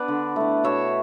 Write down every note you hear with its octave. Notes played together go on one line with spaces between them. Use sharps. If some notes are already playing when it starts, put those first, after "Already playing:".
Already playing: B3 D4 B4 D5
D3
A3 E4
B2 C#5 E5